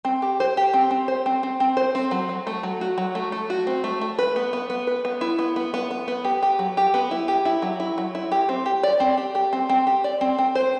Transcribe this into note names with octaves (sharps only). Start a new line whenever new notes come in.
C4
G4
C5
G4
C4
C4
C5
C4
C4
C4
C5
C4
F#3
F#3
A3
F#3
F#4
F#3
A3
A3
F#4
C4
A3
A3
B4
B3
B3
B3
B4
B3
E4
B3
B3
B3
B3
B3
G4
G4
F#3
G4
B3
E4
G4
E4
F#3
E4
F#3
E4
G4
C4
G4
D5
C4
G4
G4
C4
C4
G4
D5
C4
C4
C5